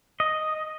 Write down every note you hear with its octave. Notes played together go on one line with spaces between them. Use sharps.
D#5